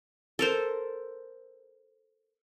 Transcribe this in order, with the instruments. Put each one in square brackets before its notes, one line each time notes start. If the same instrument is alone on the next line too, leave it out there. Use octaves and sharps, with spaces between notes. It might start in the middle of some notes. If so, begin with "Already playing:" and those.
[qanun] A4 A#4 C5